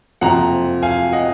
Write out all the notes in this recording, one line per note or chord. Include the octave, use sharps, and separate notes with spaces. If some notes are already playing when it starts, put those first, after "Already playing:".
F#1 F2 C3 F3 F#5 A#5
F5 G#5
D#5 F#5